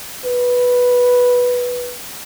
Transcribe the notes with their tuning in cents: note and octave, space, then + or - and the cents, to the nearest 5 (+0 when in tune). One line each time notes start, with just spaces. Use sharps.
B4 -5